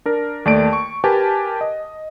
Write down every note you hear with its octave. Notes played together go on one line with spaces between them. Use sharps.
D4 A#4
D#2 A3 D5 A5 D7
C#6
G4 A#4 B4 G#5 A5
D#5